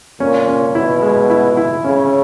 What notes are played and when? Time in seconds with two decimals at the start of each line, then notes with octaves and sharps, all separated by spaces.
0.20 A#2 C#4
0.48 C#4
0.75 B2 E4
1.02 G#3
1.30 E4
1.57 E4
1.84 C#3 C#4